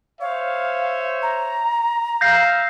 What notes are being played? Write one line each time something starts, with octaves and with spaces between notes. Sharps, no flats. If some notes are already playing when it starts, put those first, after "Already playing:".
C5 C#5 E5 F5
A#5
E5 F5 G6 A#6 C7